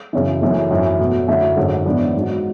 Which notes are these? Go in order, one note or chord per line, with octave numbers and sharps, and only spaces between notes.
F#2 C#3 E3
F#1 F#2 E3 A3
G#1 F#2 E3
B2 F#3 A3
F#2 D3 F#3 A3 E4
G#1 F#2 D3 G#3
G#1 G#2 E3 B3 D4
G#1 G#2 F#3